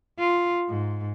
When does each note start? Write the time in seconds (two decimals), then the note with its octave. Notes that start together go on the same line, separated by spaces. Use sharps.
0.19 F4
0.69 G#2